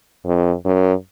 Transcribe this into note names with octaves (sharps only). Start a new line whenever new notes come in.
F2
F#2